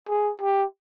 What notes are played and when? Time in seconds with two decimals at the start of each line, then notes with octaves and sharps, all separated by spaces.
0.09 G#4
0.42 G4